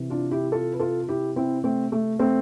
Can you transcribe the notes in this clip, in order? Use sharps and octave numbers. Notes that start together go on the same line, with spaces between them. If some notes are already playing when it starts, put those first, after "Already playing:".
Already playing: C3 E3
D4 F4
E4 G4
F4 A4
B4
F4 A4
E4 G4
C4 E4
A3 C4
A3
A3 C4